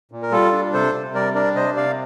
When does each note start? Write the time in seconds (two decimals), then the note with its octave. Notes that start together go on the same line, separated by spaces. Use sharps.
0.11 A#2
0.23 A#4
0.31 G3 F4 A4
0.53 D4
0.73 C3 A4 C5
0.93 C3
1.14 G3 A#4 D5
1.35 D4 A#4 D5
1.55 C3 C5 D#5
1.76 C3 D5 F5